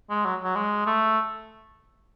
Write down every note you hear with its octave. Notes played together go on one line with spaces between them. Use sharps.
G#3
F#3
F#3
G#3
A3